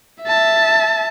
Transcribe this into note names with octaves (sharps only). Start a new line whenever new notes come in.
E5 A5